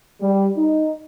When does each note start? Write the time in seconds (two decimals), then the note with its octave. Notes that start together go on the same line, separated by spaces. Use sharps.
0.21 G3
0.57 D#4